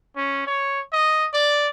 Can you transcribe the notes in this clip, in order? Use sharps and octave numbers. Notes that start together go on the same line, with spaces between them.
C#4
C#5
D#5
D5